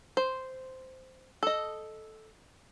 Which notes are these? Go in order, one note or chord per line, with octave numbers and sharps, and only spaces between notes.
C5
A4 D#5